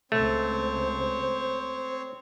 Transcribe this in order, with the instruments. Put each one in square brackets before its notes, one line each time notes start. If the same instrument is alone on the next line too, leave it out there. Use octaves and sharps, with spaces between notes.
[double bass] C#2 [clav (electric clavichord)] A3 [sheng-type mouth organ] C4 C#5 [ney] C5